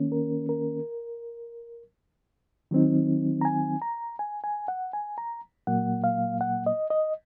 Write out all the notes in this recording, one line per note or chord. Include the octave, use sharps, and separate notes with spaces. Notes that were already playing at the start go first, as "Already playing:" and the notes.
Already playing: D#3 A#3 C#4
A#4
A#4
D#3 F#3 C4 D#4
A#5
G#5
A#5
G#5
G#5
F#5
G#5
A#5
A#2 F#3 A#3 F#5
F5
F#5
D#5
D#5